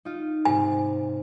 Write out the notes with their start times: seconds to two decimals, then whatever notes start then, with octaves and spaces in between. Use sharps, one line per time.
0.05 D#4 F4
0.45 G#2 C3 G#5